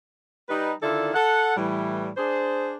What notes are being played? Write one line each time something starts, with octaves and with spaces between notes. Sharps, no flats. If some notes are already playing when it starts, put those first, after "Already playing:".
G3 D#4 B4
D3 D#3 E4 F4 A4 D5
A4 F#5
A2 E3 G3
D4 G#4 C5